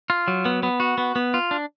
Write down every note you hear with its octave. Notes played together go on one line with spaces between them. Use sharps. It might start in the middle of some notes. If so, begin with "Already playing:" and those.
F4
F#3
B3
B3
F#4
B3
B3
F4
D4